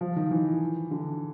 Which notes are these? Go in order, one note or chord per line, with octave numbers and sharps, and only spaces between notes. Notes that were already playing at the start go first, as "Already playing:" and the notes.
F3
D#3
E3
D3